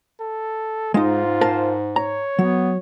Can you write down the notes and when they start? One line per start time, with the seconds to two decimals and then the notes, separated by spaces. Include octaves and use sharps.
0.20 A4
0.94 G#2 G#3 D#4 F4
1.41 A#4 C5 A5
1.96 C#5 A#5
2.39 F#3 B3